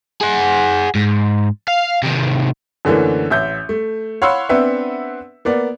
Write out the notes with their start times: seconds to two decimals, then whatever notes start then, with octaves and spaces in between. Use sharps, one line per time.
0.21 G#4 F#5
0.95 G#2
1.68 F5
2.03 C3 D#3
2.85 F#2 D3 E3 A3 A#3
3.30 A1 E5 G6
3.69 A3
4.22 C#5 F5 F#5 B5 C6 E6
4.49 B3 C4 D4 B4 E5 F#5
5.45 A#3 B3 D5